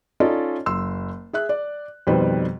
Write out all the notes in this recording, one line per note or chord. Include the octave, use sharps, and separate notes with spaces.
C#4 D#4 F4 A4 D5 D#5
F#1 C6 E6
G#4 E5 F#6
D5
F2 B2 D#3 G3 B4 C5